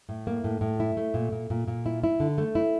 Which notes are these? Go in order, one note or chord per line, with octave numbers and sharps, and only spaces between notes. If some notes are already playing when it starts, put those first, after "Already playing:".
A2
A#3
A2
A2
E4
A3
A#2
A#2
A#2
A#2
E4
E4
D3
A3
E4